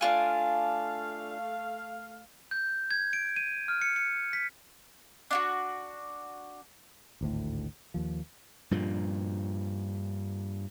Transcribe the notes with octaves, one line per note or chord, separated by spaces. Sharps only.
A3 D4 F4 F5 G#5
G6
G#6
D7
D#7
F6
C#7
C#7
B6
D4 F4 F#4
G#1 D2 A2
D#2 F3
G2 A#2 F3